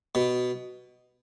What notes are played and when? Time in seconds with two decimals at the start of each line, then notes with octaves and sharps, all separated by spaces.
0.15 B2